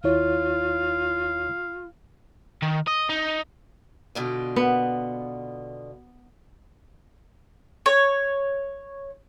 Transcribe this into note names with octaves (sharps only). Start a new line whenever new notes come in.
D#2 E4 F4 C#5 F5
D#3
D#5
D#4
B2 D3 F4
B3
C#5